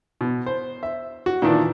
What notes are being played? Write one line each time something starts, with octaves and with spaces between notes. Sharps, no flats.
B2
C5
E5
F#4
A#2 D#3 E3 D4